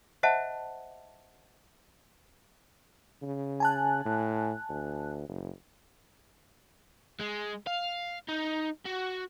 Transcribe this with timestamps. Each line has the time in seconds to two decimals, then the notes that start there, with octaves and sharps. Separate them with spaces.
0.23 C5 D#5 E5 F#5 A5
3.22 C#3
3.60 G#5 A5 F#6
4.05 A2
4.70 D2
5.29 F#1
7.19 G#3
7.67 F5
8.29 D#4
8.86 F#4